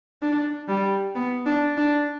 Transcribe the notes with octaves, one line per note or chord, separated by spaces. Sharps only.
D4
G3
B3
D4
D4